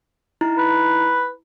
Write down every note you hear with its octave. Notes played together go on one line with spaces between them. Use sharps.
D#4 E4 A#5
B4